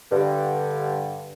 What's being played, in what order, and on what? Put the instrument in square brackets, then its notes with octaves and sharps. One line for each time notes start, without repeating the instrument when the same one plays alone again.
[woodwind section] G2 D3